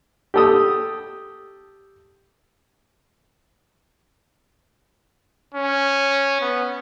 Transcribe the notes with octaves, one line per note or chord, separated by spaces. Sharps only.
G4 A4 D#6
C#4
B3